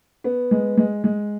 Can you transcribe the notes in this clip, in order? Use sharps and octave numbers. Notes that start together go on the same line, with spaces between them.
B3
G#3
G#3
G#3